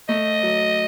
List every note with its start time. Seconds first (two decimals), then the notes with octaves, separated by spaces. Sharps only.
0.09 A3 D#5
0.43 F#3